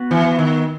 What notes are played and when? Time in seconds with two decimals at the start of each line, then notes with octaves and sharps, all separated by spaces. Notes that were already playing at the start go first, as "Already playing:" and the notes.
Already playing: B3 F#4 B4
0.11 E3
0.39 D#3